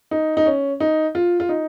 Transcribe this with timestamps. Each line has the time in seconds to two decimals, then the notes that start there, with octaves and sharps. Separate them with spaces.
0.11 D#4
0.37 D#4
0.46 C#4
0.80 D#4
1.15 F4
1.40 F4
1.49 D#4